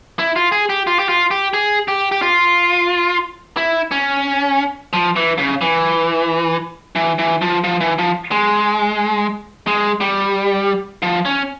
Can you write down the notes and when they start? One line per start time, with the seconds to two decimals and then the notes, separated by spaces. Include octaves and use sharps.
0.19 E4
0.36 F4
0.52 G#4
0.69 G4
0.87 F4
0.99 G4
1.09 F4
1.31 G4
1.54 G#4
1.88 G4
2.12 G4
2.22 F4
3.57 E4
3.91 C#4
4.93 F3
5.16 E3
5.38 C#3
5.61 E3
6.96 E3
7.19 E3
7.42 F3
7.64 F3
7.81 E3
7.98 F3
8.31 G#3
9.67 G#3
10.01 G3
11.02 F3
11.25 C#4